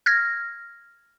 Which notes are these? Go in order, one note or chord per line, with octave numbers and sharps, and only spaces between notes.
F6 G#6 A#6